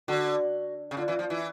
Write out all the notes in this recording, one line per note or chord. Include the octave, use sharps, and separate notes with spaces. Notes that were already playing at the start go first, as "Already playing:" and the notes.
D3 F#4
C#3
D3 F4
E3 F4
F3 F4
E3 E4